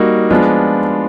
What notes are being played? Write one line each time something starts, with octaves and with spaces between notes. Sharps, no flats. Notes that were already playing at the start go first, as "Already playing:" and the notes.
Already playing: G3 A#3 D#4 F#4
F3 G#3 B3 D4 F4